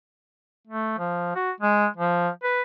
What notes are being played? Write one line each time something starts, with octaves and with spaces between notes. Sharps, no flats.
A3
F3
F#4
G#3
F3
B4